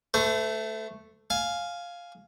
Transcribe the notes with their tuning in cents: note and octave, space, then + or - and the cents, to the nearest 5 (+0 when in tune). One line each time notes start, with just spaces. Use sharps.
A3 +0 C5 -45
F5 +0 G#5 +15